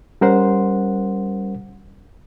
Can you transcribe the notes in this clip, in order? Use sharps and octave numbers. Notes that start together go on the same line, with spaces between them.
G3 C#4 A#4 C5 F#5 C6